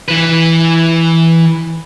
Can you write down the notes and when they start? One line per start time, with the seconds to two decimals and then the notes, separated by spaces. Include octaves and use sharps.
0.09 E3 B4